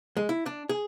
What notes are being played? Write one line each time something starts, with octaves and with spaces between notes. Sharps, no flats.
G#3
E4
D4
G#4